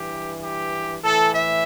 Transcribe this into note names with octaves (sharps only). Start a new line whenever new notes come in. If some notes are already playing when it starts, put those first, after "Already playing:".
Already playing: G2 E3 G4
G4
A2 E3 A4
E5